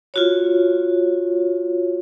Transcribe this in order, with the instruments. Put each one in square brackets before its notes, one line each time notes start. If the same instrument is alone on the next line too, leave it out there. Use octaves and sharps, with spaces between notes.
[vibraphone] F4 F#4 C#5